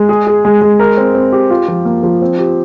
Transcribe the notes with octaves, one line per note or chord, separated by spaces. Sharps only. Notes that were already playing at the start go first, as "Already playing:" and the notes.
Already playing: G#3
G#4
G#4
G#3
G#3
A#4
C4
C4
G4
F4
F3
A#3
F3
C4
G4